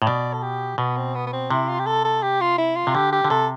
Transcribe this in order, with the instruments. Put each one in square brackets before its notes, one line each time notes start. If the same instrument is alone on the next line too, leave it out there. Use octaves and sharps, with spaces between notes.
[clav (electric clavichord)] A2
[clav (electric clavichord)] B2 [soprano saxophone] D5
[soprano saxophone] A4
G4
[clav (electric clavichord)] B2 [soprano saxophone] B3
[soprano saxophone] C4
B3
B3
C4
[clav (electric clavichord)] C3 [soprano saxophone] E4
[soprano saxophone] F4
G4
A4
A4
G4
F4
E4
F4
[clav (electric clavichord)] C3
[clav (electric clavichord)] D3 [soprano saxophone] G4
[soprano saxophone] G4
[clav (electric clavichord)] D3
[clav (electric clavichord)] C3 [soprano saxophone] A4